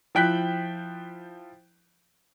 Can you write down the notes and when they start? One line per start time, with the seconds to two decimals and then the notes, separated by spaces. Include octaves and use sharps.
0.15 F3 E4 G5 F#6 B6